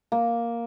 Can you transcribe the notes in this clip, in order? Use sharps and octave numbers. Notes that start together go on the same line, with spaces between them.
A#3